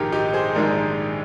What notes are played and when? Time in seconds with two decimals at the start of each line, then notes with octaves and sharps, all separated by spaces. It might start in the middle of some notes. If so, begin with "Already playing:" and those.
Already playing: A#1 G#2 D#3 G#3 G4 A#4
0.12 D#4 G4
0.33 G#4 C5
0.55 A#1 G#2 D#3 G#3 A#4 D5